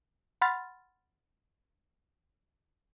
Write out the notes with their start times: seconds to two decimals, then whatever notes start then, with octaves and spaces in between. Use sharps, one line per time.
0.42 F#5 B5 C6 F6 A6